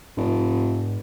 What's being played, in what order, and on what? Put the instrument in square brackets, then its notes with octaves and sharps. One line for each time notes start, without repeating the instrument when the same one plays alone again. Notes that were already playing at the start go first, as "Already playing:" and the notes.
[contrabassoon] F1 [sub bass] G#2